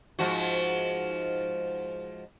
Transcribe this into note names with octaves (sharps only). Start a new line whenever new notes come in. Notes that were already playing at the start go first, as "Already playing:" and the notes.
G#2 F3 F#4